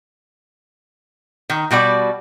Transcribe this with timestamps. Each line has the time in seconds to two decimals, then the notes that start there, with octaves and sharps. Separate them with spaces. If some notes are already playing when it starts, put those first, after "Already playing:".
1.50 D#3
1.71 B2 G3 F#4 D5